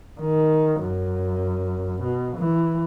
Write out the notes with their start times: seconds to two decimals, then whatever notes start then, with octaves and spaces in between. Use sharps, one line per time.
0.21 D#3
0.81 F#2
2.03 B2
2.37 E3